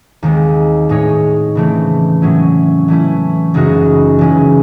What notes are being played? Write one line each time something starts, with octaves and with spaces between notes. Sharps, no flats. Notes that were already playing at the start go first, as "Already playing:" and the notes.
D#2 D#3 G#3 C4
A2 G#3 D#4 G#4 C#5
C#3 E3 A3 C4
A2 F#3 C#4 E4
E3 A3 C#4 E4
F#2 C#3 G#3 D#4 F#4
C#3 E3 G#3 C#4 E4